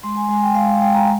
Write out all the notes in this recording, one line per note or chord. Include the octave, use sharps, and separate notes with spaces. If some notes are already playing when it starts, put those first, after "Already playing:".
G#3 C6
G#5
G#3 G#5
G5
G#3 F5
F5
G#3 G5
A#5